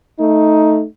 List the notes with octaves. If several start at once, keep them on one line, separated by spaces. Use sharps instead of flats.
A3 D#4